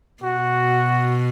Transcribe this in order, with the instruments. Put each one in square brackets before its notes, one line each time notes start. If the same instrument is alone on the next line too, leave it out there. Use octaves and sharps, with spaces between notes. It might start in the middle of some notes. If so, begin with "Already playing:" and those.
[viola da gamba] B2 [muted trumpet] F#4